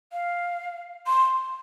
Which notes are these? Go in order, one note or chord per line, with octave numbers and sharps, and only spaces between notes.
F5
C6